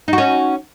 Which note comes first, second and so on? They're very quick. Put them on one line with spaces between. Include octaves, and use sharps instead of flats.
D#4 F#4 C#4